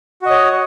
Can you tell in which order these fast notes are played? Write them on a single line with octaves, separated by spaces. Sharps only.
F#4 D#5 C#5